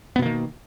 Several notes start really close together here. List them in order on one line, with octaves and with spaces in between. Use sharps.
B3 B2 A#3 D#3